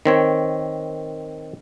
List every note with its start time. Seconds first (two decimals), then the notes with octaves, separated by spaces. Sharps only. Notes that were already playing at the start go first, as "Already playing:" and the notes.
0.06 D#3 C4 C#5